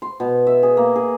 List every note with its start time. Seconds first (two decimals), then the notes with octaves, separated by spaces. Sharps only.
0.02 C6
0.20 B2
0.47 E5
0.63 G#4
0.77 A#3
0.96 G#4